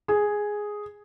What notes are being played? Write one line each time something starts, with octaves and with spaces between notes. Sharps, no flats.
G#4